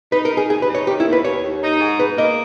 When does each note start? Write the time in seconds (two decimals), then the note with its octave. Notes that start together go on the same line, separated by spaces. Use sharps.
0.12 D#4 B4
0.25 A#4
0.31 D#4
0.37 G#4
0.50 D#2 G#4
0.62 B4
0.69 D#4
0.75 C#5
0.87 D#3 G4
1.00 E4
1.06 D#2
1.13 B4
1.24 D#2 C#5
1.43 D#2
1.62 D#4
1.80 G#2
1.99 G#2 B4
2.18 A#3 D#5